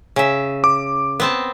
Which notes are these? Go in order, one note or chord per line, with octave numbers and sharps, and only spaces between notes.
C#3 E5
D6
B3 C4 A5